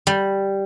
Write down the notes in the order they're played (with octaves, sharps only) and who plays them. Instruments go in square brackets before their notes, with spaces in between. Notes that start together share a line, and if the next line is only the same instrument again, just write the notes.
[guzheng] G3